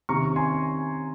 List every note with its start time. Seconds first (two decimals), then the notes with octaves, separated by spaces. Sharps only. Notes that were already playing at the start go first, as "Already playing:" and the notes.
0.09 C3 D#3 A#3 C#4 A#5 C#6
0.36 G#5 C6